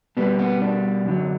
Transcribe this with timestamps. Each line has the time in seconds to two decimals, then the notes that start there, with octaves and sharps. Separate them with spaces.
0.17 B2 G3 B3
0.39 B3
0.61 D4
1.06 F#2 D3 F#3